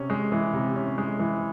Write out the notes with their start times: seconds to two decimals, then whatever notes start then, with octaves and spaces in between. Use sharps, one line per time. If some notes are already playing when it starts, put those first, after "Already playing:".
Already playing: C3 C#4
0.10 G#3
0.32 E3
0.54 C3
0.76 C#4
0.98 G#3
1.19 E3